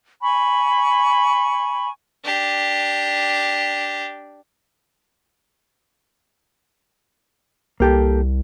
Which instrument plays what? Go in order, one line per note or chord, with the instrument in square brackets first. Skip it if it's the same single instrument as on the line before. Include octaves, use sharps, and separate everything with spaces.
[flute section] G#5 B5 C#6
[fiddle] D4 G4
[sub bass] C2 [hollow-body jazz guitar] A#3 G4 A4